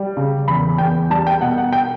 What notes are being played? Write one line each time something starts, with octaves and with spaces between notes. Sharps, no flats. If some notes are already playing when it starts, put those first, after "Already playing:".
Already playing: G3
C#3
E2 B5
E2 G5
G3 A5
G5
B2 F#5
F#5
G5